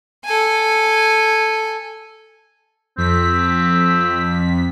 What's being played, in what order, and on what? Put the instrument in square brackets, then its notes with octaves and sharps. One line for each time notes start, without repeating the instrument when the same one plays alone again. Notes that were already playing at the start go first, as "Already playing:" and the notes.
[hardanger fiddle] A4 G#5
[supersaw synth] F2 B6 [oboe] C4